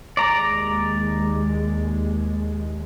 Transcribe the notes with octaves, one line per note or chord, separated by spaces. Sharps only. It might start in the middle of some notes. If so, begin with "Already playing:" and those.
D#2 G#3 D5 A#5